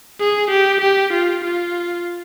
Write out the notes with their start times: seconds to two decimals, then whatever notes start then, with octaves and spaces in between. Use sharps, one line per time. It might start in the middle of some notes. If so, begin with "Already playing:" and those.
0.20 G#4
0.50 G4
0.81 G4
1.13 F4
1.44 F4